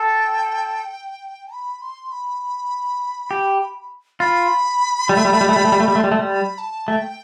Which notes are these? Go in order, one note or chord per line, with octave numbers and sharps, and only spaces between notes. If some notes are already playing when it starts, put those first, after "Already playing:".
Already playing: A4 G5
B5
C6
B5
G4
F4 B5
G3
A3
G3
A3
G3
A3
G3
A3
G3
A3
G3
A3
G3 C6
A3
G3
B5
A5
A3 G5